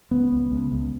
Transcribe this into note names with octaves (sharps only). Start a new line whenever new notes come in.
C#2 B3
C#2
C#2
C#2